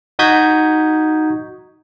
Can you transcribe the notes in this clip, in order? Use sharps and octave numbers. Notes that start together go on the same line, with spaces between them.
D#4 F#4 D#6 G6 G#6 B6